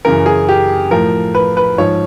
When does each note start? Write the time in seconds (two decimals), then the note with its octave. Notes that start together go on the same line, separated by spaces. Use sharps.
0.05 F#2 C#3 E3 A#4
0.26 G#4
0.49 G4
0.91 A2 F3 A#4
1.35 B4
1.57 B4
1.78 G#2 F3 C#5